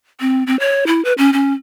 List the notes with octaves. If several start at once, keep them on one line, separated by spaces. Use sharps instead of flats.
C4
C4
C#5
E4
B4
C#4
C#4